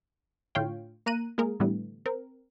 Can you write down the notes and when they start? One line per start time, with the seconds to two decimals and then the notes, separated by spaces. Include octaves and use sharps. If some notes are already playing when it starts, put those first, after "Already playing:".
0.55 A2 D3 F4 C#5 F5 G5
1.06 A#3 A#5 F#6 D#7
1.38 G#3 A#3 G#4 A#4
1.60 A2 D3 E3 G3 A3 B3
2.06 C4 A#4